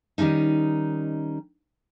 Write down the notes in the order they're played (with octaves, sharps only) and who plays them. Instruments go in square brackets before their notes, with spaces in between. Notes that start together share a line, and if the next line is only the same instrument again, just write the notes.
[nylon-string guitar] D#3 G3 G#3 C#4 D#4